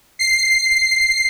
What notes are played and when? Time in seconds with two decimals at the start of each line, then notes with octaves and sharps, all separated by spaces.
0.19 C7